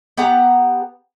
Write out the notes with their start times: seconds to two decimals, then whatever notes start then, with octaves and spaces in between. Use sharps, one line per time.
0.17 B3 G4 F#5 A#5